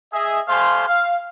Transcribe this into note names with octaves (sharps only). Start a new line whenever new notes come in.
G#4 D#5 E5
G3 A3 C5 F5 G#5 C6
F5